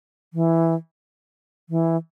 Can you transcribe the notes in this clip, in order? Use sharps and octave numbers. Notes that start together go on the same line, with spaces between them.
E3
E3